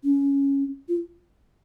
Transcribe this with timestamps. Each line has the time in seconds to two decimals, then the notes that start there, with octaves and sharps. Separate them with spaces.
0.04 C#4
0.89 F4